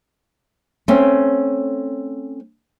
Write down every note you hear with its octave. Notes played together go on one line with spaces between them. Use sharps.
A3 C4 C#4